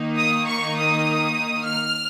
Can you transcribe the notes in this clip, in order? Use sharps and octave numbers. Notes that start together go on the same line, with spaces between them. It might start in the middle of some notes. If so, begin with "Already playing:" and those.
Already playing: D#3 A#3 D#4
D#6
C#6
D#6
F6